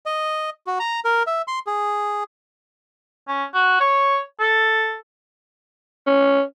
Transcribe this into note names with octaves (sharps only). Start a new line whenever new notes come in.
D#5
F#4
A#5
A#4
E5
C6
G#4
C#4
F#4
C#5
A4
C#4